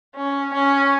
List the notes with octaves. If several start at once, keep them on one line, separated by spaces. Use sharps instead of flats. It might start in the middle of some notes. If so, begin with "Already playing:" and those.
C#4
C#4